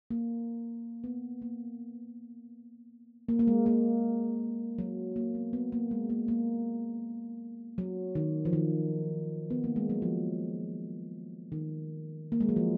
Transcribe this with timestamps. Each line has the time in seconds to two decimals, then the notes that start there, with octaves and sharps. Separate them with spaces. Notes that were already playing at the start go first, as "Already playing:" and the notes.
0.11 A#3
1.04 B3
1.42 A#3
3.29 A#3
3.39 A#3
3.47 G#3
3.66 A#3
4.79 F#3
5.16 A#3
5.35 B3
5.53 B3
5.72 A#3
5.91 G#3
6.09 A#3
6.28 A#3
7.78 F#3
8.15 D#3
8.45 F3
8.53 D#3
9.50 B3
9.64 A#3
9.76 G#3
9.90 F#3
10.02 F3
11.52 D#3
12.32 A#3
12.41 G#3
12.49 F#3
12.56 F3